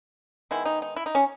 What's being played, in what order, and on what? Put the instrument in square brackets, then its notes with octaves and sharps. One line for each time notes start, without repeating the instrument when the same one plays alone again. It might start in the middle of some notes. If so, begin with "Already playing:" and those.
[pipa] D#3 G#3 B3 E4
D#4
D#4
E4
D#4
C#4